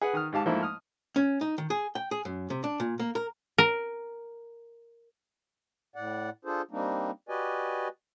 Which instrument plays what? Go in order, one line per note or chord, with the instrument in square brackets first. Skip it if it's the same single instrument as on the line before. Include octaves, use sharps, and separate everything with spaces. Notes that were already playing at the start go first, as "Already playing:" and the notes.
[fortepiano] G#4 B4 F#5
D#3 D#6 F6
G#2 G4 F5 A5
G#2 F3 A3 A#3 E4
D#6 F6
[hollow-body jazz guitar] C#4
D#4
D#3
G#4
G5
G#4
F#2
C3
D4
A#2
A#3
A#4
[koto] A#4
[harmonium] A2 D5 F#5
D4 F4 G#4 A4 C5
G3 A#3 C4 D4 D#4
F#4 G4 B4 D5 D#5 G#5